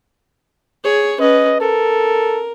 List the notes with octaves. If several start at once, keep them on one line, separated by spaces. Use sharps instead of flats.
G#4 C#5
C#4 B4 D#5
A4 A#4